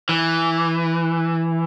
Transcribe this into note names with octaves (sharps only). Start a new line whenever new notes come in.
E3